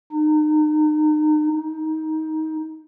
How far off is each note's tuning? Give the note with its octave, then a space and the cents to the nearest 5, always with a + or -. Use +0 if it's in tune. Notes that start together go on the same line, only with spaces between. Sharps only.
D#4 -30
D#4 +20